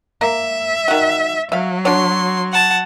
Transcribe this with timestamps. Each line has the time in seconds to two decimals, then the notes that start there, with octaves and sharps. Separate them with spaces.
0.21 A#3 E5
0.88 D#3 F#4
1.52 F#3 E5 F5
1.85 D4 F#4 C#5 C6
2.52 F#5 A5